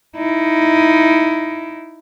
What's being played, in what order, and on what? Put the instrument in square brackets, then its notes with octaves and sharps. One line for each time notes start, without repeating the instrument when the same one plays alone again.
[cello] D#4 E4